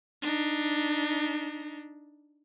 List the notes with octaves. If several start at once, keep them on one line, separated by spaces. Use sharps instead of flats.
D4 D#4